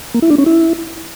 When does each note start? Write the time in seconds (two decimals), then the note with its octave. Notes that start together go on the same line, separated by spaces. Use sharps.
0.14 A#3
0.22 E4
0.30 D4
0.38 C#4
0.46 E4